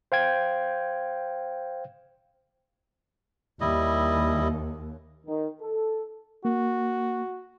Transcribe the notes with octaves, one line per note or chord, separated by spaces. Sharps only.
C5 F5 G5 G#6
D#2 G3 E4 D#5
D#3
A4
A#3 F#4